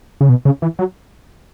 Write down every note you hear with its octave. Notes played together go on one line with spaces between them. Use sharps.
C#3
B2
C#3
E3
F#3